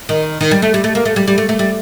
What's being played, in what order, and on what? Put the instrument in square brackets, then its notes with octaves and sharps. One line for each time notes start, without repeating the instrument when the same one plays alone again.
[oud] D#3
D#3
G3
A3
G3
A3
A#3
A3
G3
G3
A3
A3
G3